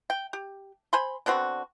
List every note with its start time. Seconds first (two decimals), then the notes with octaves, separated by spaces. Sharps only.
0.10 G5
0.33 G4
0.93 C5 G#5 B5 C6
1.26 D3 B3 C4 F#4